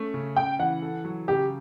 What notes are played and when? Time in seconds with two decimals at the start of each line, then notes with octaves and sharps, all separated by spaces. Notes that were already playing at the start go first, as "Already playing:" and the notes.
Already playing: A3 C#4
0.14 C#3
0.36 C#3 G5
0.59 E3 F#5
0.82 A4
1.05 F#3
1.28 C#3 G4